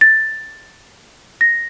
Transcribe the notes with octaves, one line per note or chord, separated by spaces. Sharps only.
A6
A#6